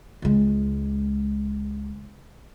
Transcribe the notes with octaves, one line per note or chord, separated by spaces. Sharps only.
C#2 G#3